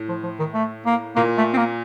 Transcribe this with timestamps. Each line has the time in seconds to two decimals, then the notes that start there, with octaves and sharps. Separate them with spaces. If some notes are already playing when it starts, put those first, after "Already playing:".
Already playing: A2
0.09 F3
0.23 F3
0.39 D#3
0.54 A3
0.86 A#3
1.16 A#2 A#3
1.37 A3
1.53 C4
1.58 A#3